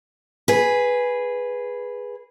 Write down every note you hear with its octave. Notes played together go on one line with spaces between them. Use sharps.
G#4 B4